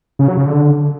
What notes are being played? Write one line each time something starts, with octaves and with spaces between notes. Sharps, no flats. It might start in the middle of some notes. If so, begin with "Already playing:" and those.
C#3
F#3
C#3
D3